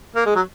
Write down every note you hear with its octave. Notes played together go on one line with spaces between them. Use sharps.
A#3
G#3
F#3